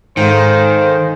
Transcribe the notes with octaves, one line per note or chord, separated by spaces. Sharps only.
G#2 D#3 A4 C5 F5 G#5